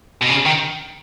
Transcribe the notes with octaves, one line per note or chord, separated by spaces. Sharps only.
B2
C#3
D#3